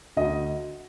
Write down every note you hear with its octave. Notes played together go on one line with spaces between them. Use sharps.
D2 D#5